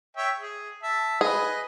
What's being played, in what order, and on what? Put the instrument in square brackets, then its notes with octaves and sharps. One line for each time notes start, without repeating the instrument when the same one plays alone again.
[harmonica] C#5 E5 G5
G#4
E5 A5
[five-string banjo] G#4 [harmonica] B4 D#5